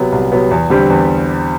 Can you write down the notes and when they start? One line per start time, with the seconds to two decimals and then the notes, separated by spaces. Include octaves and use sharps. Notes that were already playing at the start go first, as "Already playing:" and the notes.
Already playing: C3 F#3 B3
0.12 C2
0.32 C3 F#3 B3
0.51 E2
0.70 D3 G3 C4 G4
0.90 E2